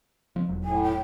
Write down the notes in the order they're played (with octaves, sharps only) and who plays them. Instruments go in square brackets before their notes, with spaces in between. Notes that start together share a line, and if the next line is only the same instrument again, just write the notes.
[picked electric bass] F3 C4
E1 F#3
[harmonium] A2 [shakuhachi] G#5
[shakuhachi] G5